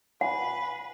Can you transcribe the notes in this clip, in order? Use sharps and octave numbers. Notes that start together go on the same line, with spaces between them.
B4 F#5 G#5